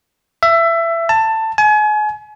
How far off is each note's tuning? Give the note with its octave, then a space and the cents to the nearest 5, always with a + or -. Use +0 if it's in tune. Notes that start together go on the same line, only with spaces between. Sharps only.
E5 +20
A5 +15
G#5 +35